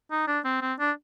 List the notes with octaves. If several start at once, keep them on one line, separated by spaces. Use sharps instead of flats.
D#4
D4
C4
C4
D4